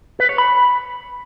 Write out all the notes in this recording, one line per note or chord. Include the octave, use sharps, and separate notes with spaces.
B4
C#5
B5